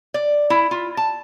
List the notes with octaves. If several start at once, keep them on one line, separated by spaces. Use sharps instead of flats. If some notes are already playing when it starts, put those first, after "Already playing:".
D5
E4
F4
A5